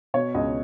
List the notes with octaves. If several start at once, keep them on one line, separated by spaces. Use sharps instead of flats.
B2 C#5
C#2 D#5